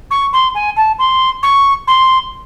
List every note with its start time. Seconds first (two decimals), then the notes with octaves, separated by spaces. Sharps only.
0.11 C#6
0.33 C6
0.55 G#5
0.77 A5
0.99 C6
1.43 C#6
1.87 C6